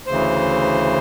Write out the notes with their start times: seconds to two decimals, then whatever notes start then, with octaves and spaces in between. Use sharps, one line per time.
0.07 D2 C#3 E3 C5